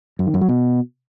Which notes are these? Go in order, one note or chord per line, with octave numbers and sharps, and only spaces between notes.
F#2
D#3
F#2
F#3
B2